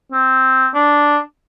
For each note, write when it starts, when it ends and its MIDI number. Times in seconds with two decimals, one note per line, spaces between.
0.12 0.68 60
0.74 1.18 62